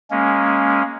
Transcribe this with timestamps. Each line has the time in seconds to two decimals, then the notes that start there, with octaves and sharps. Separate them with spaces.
0.11 G#3 A#3 C#4